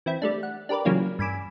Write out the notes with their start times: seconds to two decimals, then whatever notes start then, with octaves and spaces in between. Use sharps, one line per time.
0.06 E3 C4 E4
0.22 G3 A3 D4
0.43 F#5
0.69 D4 G4 A#4 B4 D5
0.85 C#3 E3 F#3 A#3 C#4 F4
1.19 G2 G#5 B5 D6 E6